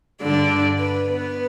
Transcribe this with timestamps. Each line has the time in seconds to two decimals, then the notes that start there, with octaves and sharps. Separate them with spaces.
0.21 G2 D3 D5
0.78 B4
1.07 B3